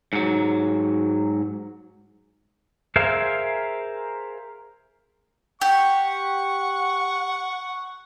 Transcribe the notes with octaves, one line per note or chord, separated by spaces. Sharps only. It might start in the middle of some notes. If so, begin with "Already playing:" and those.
G#2 F#3
G#4 A#4 C5 E5 F5
G4 F#5 C#6